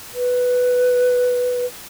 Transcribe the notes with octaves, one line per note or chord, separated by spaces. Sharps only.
B4